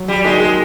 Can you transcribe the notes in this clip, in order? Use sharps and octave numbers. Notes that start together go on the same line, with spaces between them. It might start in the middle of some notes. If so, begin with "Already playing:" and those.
Already playing: F#3
G3
G#3 A#3 D#4 F#4
G#3